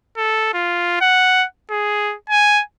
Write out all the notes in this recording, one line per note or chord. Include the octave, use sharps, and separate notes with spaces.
A4
F4
F#5
G#4
G#5